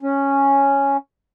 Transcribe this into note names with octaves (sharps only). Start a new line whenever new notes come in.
C#4